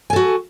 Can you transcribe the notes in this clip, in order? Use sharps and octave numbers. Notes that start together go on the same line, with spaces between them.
F#4 A4 G#5